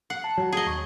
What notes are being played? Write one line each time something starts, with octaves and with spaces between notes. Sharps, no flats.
F#5 C7
A5
F#3
G#4 D#5
D#2 C#6